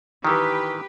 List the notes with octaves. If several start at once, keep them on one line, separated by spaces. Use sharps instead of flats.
D#3 E3 G4 B4